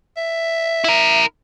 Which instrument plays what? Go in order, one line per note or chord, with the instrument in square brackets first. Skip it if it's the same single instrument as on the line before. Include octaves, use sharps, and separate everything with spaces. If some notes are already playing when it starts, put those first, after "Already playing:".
[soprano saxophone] E5
[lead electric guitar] E4 A#4